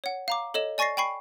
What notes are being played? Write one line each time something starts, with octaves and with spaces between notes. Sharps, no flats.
C#5 F#5
F5 A#5 D6
A4 C#5 D#5 E7
D5 G#5 C#6 A6 A#6 C7
G5 G#5 B5 C#6 C7